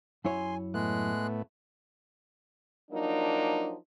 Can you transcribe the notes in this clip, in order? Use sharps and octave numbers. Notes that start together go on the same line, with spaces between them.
F#2 E4 C#5 G#5 C6
A2 G#3 A3 B3 F#6
F3 F#3 A#3 D4 D#4